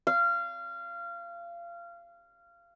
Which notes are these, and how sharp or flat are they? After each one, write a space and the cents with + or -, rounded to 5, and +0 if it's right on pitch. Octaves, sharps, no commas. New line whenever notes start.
F5 -25